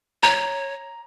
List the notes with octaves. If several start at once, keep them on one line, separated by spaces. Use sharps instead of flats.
C#5 A#5